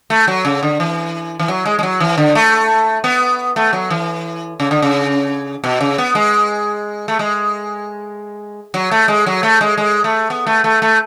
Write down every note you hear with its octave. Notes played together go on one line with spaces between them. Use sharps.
A3
F#3
C#3
D3
E3
E3
F#3
G#3
G#3
F#3
E3
D3
A3
B3
A3
F#3
E3
C#3
D3
C#3
B2
C#3
B3
G#3
A3
G#3
F#3
A3
G#3
F#3
A3
G#3
G#3
A3
B3
A3
A3
A3